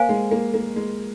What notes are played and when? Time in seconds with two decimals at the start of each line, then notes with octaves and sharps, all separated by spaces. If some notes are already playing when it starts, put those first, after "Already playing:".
Already playing: A#3 C5 F5 G#5
0.09 G#3
0.31 A#3
0.54 A#3
0.76 G#3